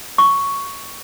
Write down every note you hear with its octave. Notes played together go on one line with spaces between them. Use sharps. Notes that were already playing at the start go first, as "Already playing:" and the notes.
C#6